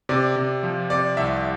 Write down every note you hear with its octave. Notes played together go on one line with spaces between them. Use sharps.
C3 D5
C3
F3
C3 D5
C2 E5